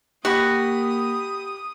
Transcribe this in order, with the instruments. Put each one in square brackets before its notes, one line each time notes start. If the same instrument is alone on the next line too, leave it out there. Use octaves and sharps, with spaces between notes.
[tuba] A#3 [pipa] F#4 [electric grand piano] G4 B5 [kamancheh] D#6